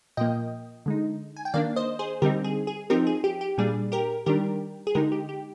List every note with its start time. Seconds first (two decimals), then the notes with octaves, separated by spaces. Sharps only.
0.17 A#2 F3 A#3 D#5 G5
0.86 D3 G#3 D#4
1.37 G#5
1.45 G5
1.54 D#3 A#3 D4 D5 F5
1.76 C5 D#5
1.99 G#4 C5
2.22 D3 G3 C4 D#4 G4 A#4
2.44 G#4
2.67 G#4
2.90 F3 C4 D#4 G4 A#4
3.07 G#4
3.24 G4
3.41 G4
3.58 A#2 G3 D4 G#4
3.92 G4 A#4
4.26 D#3 G3 D4 G4 A#4
4.87 G#4
4.95 D3 G#3 D#4 G4 A#4
5.12 G4
5.29 G4